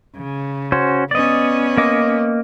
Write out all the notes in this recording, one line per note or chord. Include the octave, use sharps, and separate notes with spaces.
C#3
C#4 F#4 C5
B3 C#4 D5 D#5
A#3 D#5 D6